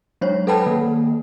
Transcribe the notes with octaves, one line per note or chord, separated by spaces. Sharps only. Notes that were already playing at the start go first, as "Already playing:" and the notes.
F#3 G#3 D4 C5 C#5
A4 B4 F#5 G5 A5 B5
D#3 A#3